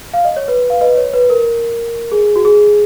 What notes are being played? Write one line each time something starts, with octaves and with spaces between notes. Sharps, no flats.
F5
D#5
C#5
B4
F5
B4 D#5
C#5
B4
A#4
G#4
F#4
G#4